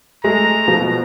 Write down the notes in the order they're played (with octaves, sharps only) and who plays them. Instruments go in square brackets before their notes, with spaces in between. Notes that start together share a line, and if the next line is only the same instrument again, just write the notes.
[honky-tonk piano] G#3 A3 [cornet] A#5
[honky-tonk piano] B2 F3